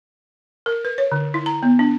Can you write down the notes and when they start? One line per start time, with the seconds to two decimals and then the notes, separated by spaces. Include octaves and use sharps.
0.66 A#4
0.85 B4
0.98 C#5
1.12 D3
1.34 E4
1.46 A#5
1.63 B3
1.79 D4